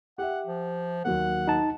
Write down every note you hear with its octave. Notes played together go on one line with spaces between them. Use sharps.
G4 E5 F#5
F3
D#2 F#3 A#3 F#5
D#4 A5